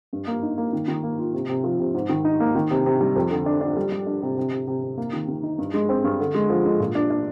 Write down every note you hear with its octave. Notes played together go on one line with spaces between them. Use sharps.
G2
A#3
D#4
A#3
D#3
D#3
A#3
F4
C3
C3
F3
C3
G#2
D#3
D#4
A#3
D#3
C3
C3
G3
F2
D3
D4
D4
G3
G3
D4
C3
C3
C3
C3
C3
A#3
D#3
D#3
D#4
G2
G#3
C4
G2
D3
G#3
F3
G#3
A#2
D4
D4